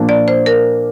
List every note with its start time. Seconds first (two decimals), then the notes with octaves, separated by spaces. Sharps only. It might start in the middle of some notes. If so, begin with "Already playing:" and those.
Already playing: A#2 F3 A#3 D4
0.09 D5
0.28 C5
0.46 A#4